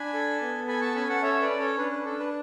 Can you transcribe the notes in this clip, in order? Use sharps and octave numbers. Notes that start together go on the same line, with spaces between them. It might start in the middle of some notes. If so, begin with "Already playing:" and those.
Already playing: D4 G#5 B5
A4
B3
A4 G#5 B5
A5 C#6
C#4 G#5 B5
F#5 A5
A4 C#5 E5
B4 D5
C#4
A4 C#5
D4 B4
B4
D4 A4
B4